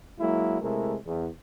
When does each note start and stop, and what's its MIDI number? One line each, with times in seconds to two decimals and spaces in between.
0.19 0.59 54
0.19 0.59 56
0.19 0.59 58
0.19 0.59 64
0.62 0.95 48
0.62 0.95 56
0.62 0.95 57
0.62 0.95 64
0.62 0.95 70
1.06 1.28 40